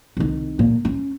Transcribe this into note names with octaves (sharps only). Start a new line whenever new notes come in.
C2 D#3
A#2
C#4